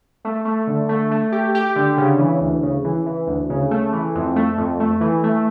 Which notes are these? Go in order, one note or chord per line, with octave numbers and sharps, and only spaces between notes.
A3
A3
D3
A3
A3
G4
G4
D3
C#3
E3
D2
C#3
E3
E3
D2
C#3
A3
E3
F2
A3
F2
A3
E3
A3